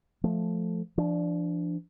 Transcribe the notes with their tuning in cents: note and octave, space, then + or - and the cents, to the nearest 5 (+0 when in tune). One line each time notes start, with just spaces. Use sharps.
F3 +0 A3 -5
F3 -35 D4 +0